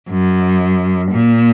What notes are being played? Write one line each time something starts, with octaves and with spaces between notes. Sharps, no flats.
F#2
A#2